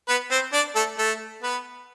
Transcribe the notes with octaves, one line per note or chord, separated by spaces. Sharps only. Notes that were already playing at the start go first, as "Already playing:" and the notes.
B3 B4
C4 C5
D4 D5
A3 A4
A3 A4
B3 B4